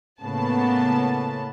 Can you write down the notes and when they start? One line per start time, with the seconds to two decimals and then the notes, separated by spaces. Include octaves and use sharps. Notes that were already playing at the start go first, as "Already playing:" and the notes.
0.22 A2 C#3 A#3 B3 A5